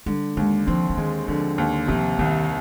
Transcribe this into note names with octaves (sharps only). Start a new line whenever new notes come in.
D3 G3
D#2 G#3
F3 C4
D3
D#3 G#3
D3 F3
D#2
C3 F3
C2 D#3